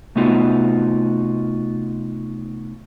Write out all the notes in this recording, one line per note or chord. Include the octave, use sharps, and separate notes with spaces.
C3 A3 B3 D#4 F4 F#4